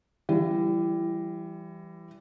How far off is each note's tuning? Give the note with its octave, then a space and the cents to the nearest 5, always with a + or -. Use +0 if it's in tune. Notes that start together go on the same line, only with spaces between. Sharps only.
E3 +25 G3 -5